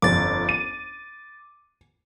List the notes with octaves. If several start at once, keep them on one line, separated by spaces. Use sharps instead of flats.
G1 F2 D6 A6
D#7